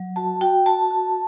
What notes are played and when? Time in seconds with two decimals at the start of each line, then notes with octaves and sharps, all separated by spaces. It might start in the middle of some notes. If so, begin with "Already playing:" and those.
Already playing: F#3
0.16 F#4 A5
0.41 F#4 G5
0.66 F#4 A5
0.91 F#4